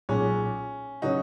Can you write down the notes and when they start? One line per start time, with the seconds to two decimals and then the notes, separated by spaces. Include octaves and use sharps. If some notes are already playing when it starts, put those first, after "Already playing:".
0.09 B1 A#2 G#3 C#4
1.02 C#3 F#3 C#4 D#4 F#4